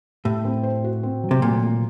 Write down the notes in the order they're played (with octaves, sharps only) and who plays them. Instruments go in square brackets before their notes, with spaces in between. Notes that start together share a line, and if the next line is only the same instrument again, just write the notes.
[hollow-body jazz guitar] A2 [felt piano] G4
[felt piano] C4
C5
F#4
C4
F#3
[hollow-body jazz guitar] C3
[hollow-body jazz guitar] A#2 [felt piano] A3
[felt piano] F#3